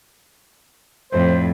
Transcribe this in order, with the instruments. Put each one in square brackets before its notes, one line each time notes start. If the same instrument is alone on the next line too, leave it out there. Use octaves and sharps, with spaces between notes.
[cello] F2 A2 [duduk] C5